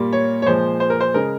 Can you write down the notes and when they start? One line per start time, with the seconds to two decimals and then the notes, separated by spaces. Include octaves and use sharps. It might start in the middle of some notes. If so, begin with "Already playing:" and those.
Already playing: A#2 G3 A#3
0.13 C#5
0.42 C#5
0.46 A#2 F3 G#3 C5
0.80 C5
0.90 A#4
1.00 C5
1.14 C#3 G#3 A#4